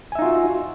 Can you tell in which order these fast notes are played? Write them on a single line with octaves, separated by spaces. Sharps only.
G#5 E5 D#4 F4 F#4